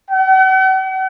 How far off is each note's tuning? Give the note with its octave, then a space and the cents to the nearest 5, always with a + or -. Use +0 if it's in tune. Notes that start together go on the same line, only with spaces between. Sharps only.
F#5 +45